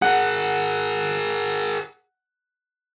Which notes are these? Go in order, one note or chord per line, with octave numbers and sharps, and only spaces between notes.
G#4 A#4 F#5